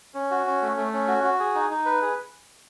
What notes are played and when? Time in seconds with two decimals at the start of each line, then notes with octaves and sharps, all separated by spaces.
0.14 C#4
0.31 F#4
0.47 C#4
0.62 A3
0.77 A3
0.93 C#4
1.08 F#4
1.23 F#4
1.40 G#4
1.55 D#4
1.70 D#4
1.85 B4
2.02 G#4